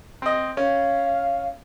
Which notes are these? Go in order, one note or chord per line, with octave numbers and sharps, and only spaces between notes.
C4 D#5
C#4 F5